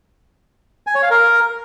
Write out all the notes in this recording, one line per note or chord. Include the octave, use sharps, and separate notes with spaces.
G#5
C#5
F5
A#4